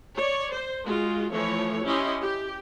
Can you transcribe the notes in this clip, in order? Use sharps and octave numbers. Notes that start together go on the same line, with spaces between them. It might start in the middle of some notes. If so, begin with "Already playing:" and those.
C#5 D5
C5
G#3 F4 F#4
E3 F3 A3 C#5
C#4 E4 G4 D#5 C6
G4